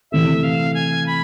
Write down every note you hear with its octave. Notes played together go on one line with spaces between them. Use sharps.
C3 E3 A3 E5
F5
G#5
B5